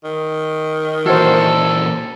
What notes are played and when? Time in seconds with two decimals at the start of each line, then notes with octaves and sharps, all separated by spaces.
0.04 D#3
1.06 A#2 E3 F#4 A4 C5